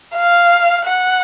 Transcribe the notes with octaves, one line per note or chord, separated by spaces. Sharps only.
F5
F#5